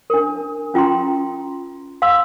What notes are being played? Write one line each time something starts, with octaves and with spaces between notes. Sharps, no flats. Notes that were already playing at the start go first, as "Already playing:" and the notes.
D4 A#4
C#4 F4 G5 A#5 C6
F5 C6 E6